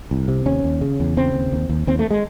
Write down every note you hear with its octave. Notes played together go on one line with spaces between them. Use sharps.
C2
C3
D#2 C#4
D#2
C#3
E2
C#3 C4
D#2
D#2
D#2
D#2 C4
A3
G#3